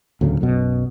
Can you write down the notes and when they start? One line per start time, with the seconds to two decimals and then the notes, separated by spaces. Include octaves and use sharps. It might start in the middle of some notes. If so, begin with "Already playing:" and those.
0.21 D2 A2 C#3 F#3
0.41 B1 F#2 B2